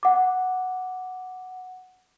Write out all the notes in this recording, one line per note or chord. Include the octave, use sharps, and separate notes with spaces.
F#5 D6